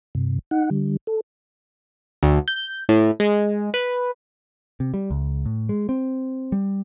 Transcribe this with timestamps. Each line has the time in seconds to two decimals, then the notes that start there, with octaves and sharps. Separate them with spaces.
0.15 G2 C3
0.51 D#4 F#5
0.70 D3 G3
1.07 A4
2.23 D2
2.48 G6
2.89 A2
3.20 G#3
3.74 B4
4.80 C3
4.94 G3
5.11 C#2
5.46 A2
5.69 G#3
5.89 C4
6.52 G3